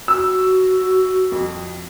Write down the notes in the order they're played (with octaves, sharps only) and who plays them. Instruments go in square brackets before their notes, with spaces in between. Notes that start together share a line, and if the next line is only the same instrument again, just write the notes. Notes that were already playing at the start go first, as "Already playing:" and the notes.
[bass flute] F#4 [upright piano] E6
[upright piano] F2